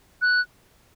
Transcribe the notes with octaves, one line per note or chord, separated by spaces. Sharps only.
F#6